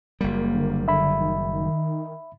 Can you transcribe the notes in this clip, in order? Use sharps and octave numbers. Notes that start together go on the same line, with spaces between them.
F#1 G3 A#3
D3
D3 E5 B5
D#3